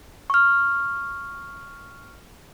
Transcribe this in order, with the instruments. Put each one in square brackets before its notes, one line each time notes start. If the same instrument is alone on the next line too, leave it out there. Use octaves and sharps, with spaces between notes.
[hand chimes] C#6 F6